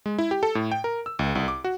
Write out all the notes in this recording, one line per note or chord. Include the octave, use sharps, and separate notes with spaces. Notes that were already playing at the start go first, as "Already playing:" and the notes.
G#3
E4
G4
A4
A2
G5
A#4
E6
C#2
C2
D6
F#4